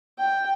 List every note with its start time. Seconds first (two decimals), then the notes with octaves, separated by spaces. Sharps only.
0.19 G5